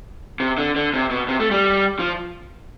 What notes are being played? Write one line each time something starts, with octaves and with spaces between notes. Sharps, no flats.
C3
D3
D3
C3
B2
C3
A3
G3
F3